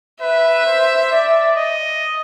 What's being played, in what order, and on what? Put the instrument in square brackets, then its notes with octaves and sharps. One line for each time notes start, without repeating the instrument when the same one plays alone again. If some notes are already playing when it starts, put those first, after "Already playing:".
[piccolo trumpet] B4 [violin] E5
[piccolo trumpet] C5
D5
D#5